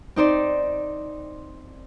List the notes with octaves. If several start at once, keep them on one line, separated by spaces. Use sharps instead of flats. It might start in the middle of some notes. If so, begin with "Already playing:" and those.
C4 D#4 C5 D5